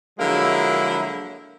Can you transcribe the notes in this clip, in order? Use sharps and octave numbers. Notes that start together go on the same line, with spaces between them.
D3 F3 F#3 G#3 A#3 E4